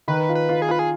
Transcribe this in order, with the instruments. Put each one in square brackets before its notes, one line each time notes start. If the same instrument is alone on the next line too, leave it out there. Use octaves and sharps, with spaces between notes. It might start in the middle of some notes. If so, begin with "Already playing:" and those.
[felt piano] D#3 [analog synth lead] B4
[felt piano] F4
[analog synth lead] B4
[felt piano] F4
[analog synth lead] G#4
[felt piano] F4 [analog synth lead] B4
[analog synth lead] G#4